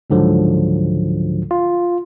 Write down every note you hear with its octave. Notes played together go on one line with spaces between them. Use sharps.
C#2 G#2 D3 F3 F#3
F4